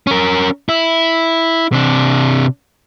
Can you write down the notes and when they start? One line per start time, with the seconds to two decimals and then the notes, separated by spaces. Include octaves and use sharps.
0.07 C#4 A#4
0.69 E4
1.72 C3 D4